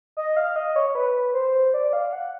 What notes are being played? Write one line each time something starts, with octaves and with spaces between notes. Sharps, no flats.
D#5
F5
D#5
C#5
B4
C5
D5
F5
F#5